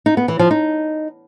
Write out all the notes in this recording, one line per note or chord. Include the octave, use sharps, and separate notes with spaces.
D#4
B3
E3
F3
D#4